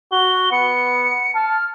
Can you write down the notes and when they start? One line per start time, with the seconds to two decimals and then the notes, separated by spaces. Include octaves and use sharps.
0.12 F#4 G7
0.52 B3 C#7
1.35 A5 F6